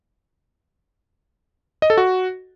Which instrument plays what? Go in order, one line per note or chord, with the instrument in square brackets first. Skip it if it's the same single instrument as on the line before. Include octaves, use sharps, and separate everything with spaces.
[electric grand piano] D#5
A4
F#4